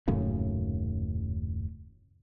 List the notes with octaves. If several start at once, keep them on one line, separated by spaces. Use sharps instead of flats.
D#1 F#2 A2 C#3